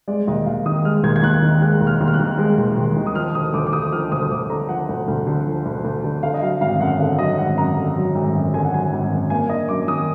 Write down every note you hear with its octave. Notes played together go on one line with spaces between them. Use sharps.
G#3 D5
D#2 D#5
D#2 F5
D#3 D#6
G#3 F6
D#2 G#6
G#6
D#2 F#6
D#3
G#3 F#6
D#2
F6
D#2
F6
F#6
D#3
G#3
D#2
D#2
D#3
D#6
F3 F6
D2 D#6
D2 D6
D6
D3 D#6
F3 F6
D2 D#6
D2 D6
D3 A#5
F3 F#5
D2
D2
D3
F3
D2
D2
D3
D3 F5
D#5
F#3 F5
G#1 F5
F#2 F#5
D3 F5
F#3 D#5
G#1 F#5
F#2 A#5
D3
F#3
G#1
F#2
D3 G#5
F#5
F#3 G#5
G#1
F#2
A#3 G#5
D4 D#5
F#2 D6
D#3 D#6